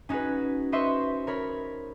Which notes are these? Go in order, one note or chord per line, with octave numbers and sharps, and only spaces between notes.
C#4 D#4 F#4 G#4 B4
B4 C5 D#5 E5 C6 C#6
A#4 C#5 B5